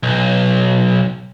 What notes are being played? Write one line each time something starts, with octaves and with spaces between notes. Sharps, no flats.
B1